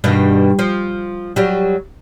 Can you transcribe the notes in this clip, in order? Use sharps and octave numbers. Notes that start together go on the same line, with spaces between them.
G2 B2 D#3
F3
F#3 G3